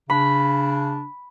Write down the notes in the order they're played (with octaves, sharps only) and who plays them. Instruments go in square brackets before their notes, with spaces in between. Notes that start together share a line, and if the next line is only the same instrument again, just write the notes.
[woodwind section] C#3 D4 [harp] B5